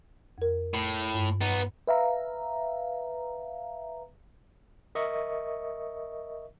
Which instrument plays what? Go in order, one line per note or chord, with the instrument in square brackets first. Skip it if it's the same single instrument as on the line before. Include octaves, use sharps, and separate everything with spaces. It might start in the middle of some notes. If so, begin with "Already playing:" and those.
[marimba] F2 A#4
[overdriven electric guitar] A2
[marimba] G2
[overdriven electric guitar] B3 D#4
[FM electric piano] B4 E5 F5 A#5
[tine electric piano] A#4 D#5 E5 C#6